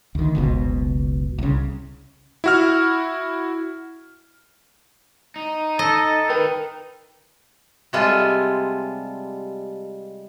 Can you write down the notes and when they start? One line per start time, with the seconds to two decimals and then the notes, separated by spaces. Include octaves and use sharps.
0.15 D2 D#3
0.35 F#1 C#2 B2
1.39 C2 C#3
2.44 E4 F#4 F6
5.36 D#4
5.79 A4 D#5
6.30 D#3 D#4 A#4 B4 G5
7.93 C3 G3 G#3 F4 A4 G#5